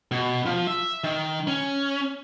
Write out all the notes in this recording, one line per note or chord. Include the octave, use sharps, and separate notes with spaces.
B2
F3
E5
D#3
C#4